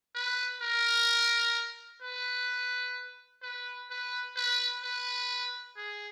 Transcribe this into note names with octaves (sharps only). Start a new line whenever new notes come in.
B4
A#4
B4
B4
B4
B4
B4
G#4